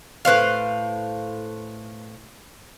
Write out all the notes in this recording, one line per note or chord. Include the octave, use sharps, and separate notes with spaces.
A2 B4 C5 F5